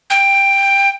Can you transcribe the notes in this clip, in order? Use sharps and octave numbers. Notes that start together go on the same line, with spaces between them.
G5